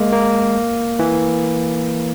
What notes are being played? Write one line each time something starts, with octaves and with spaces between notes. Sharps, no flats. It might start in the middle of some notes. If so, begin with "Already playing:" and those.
Already playing: G#3 A#3
A#3
E3